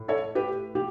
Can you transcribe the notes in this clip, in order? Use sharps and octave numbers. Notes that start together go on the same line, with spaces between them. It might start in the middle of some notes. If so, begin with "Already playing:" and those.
Already playing: A2
A4 C#5
G4 B4
G4